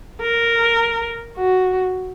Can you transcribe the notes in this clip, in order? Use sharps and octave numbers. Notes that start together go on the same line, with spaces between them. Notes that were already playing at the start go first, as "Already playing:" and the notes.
A#4
F#4